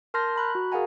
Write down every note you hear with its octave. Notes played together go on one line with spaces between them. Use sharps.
A#4 A5 C6 F6 G6 A#6
A#5 B5 F#6
F#4
G#4 A#4 F5 F#5 G#5 A#5